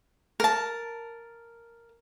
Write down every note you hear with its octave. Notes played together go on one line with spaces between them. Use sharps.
A#4 A5